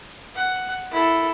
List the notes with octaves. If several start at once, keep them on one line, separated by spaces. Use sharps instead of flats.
F#5
E4 A4